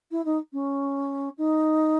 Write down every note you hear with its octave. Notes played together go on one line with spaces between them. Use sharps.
E4
D#4
C#4
D#4